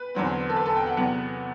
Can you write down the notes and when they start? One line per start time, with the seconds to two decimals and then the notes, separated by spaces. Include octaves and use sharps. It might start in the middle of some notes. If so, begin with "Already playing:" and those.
Already playing: B4
0.15 E2 D3 F#3 C4
0.49 A4
0.56 B4
0.66 A4
0.76 G5
0.87 F#5
0.97 E2 C3 F#3 B3 F#5